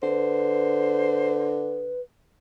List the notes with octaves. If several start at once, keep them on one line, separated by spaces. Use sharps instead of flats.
D3 B4 C5